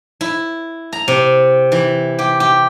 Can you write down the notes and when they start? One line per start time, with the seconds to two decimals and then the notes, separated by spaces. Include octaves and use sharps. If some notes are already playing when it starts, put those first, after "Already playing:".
0.21 E4
0.93 A#5
1.08 C3
1.72 E3
2.19 G4
2.40 G4